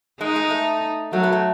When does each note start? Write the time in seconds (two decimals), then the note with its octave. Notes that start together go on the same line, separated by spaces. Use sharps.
0.20 G#3 D#4
0.36 G#3
0.50 A3
1.13 F#3 A3
1.23 B3
1.32 A3